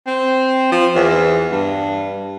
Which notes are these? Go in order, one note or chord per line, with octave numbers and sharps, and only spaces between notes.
C4
F3
E2
G2